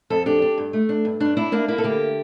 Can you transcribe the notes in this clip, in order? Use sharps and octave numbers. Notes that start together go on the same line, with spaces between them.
F2 A4
D4 G4
D4
G2
A3
D4
G2
G2 D4
D4 E4
A#3 D4
A#3 E4
A4
D3 G4